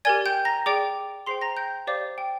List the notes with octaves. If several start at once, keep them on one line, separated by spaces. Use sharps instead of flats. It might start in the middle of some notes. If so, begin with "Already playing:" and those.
G4 A#4 D5 G#5 G#6
G5 G6
A#5 A#6
G#4 D5 G5 D6 D7
G#4 C5 G5 C6 C7
A#5 A#6
G5 G6
G4 C5 D5 F5 D6
G5